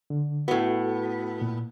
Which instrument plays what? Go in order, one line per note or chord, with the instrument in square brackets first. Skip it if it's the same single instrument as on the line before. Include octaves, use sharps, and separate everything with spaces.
[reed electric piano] D3
[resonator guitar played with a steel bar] A2 B3 [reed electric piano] F#4 A4
[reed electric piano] A#2